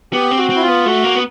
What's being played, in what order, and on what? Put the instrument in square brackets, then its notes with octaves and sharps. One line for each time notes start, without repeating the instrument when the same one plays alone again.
[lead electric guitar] B3 [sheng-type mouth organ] G4
[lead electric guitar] C4
[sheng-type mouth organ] F#4
[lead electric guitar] C4
[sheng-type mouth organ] E4
F4
[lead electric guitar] B3
[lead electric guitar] A3 [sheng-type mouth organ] F#4
[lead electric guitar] A#3
B3